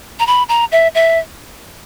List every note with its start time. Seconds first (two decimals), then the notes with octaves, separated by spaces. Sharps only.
0.19 A#5
0.27 B5
0.49 A#5
0.72 E5
0.95 E5